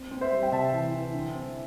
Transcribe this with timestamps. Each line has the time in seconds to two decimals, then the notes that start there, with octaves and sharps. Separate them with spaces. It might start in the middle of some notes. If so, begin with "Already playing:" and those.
Already playing: C4
0.11 C4
0.21 C5 E5
0.31 G3
0.43 G5
0.52 C3 E5 A5
0.73 E3
0.94 E3
1.14 D3
1.35 C4